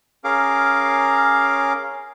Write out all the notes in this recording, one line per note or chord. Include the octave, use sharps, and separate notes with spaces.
C#4 G#4 A#4 F5 D6